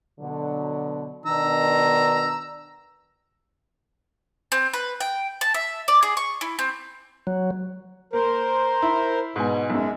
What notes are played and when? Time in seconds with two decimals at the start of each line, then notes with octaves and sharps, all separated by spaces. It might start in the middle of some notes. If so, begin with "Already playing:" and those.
0.20 B2 D3 F#3
1.26 B2 D#3 D4 A#5 E6
4.52 C4
4.73 B4
5.00 G5
5.41 A5
5.54 E5
5.88 D5
6.03 G#4
6.17 C#6
6.41 E4
6.59 C4
7.27 F#3
8.13 A#3 A#4 C5
8.82 E4
9.36 G#2 B2 B3 G#5
9.70 B1 F#2 G#3